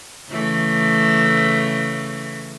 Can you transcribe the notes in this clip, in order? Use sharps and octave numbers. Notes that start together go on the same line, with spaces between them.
C#3 E3 A3